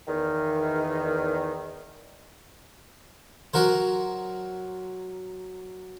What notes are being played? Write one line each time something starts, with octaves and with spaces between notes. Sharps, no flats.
E2 D#3
F#3 F#4 A#4 C5